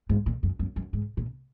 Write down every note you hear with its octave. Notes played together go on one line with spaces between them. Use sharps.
G#2
A#2
F#2
F#2
F#2
G#2
A#2